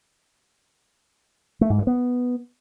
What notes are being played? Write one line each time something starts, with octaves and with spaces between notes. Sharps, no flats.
A3
G#2
G2
B3